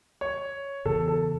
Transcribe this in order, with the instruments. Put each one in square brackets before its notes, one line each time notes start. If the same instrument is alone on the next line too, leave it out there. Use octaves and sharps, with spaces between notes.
[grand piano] C#5
[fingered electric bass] E2 C#3 E3 B3 [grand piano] A4
[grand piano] A4